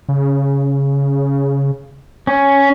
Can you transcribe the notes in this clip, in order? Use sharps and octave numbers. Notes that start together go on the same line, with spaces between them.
C#3
C#4